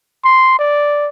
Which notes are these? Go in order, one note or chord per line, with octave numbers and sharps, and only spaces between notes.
C6
D5